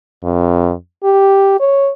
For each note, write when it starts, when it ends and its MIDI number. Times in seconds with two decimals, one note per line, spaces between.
0.24 0.72 41
1.04 1.56 67
1.60 1.90 73